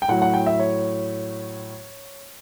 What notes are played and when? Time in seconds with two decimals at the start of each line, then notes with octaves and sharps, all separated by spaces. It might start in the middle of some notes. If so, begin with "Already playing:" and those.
0.02 G5
0.08 A2 F#3 F#5
0.22 F#5
0.34 G5
0.46 E5
0.60 C#5